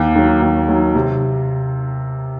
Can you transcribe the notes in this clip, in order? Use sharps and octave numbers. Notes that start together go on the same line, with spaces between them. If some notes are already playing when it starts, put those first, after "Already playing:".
Already playing: D#2
D#3 F#3
D#2
D#3 F#3
C3